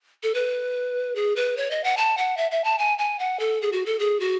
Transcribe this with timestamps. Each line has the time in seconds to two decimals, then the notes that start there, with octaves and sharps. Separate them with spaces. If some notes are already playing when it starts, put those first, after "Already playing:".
0.23 A4
0.34 B4
1.15 G#4
1.36 B4
1.57 C#5
1.71 D#5
1.84 F#5
1.97 A5
2.17 F#5
2.37 E5
2.51 E5
2.64 A5
2.78 G#5
2.98 G#5
3.19 F#5
3.39 A4
3.62 G#4
3.72 F#4
3.86 A4
3.99 G#4
4.20 F#4